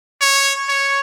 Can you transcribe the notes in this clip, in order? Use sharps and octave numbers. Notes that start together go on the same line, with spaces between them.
C#5
C#5